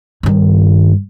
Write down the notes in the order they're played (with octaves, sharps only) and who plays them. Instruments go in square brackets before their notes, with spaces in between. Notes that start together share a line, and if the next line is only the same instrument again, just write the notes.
[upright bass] G2 D#3